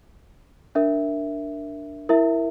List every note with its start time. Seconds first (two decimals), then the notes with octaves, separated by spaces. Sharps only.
0.75 D4 A#4 E5
2.09 E4 A#4 E5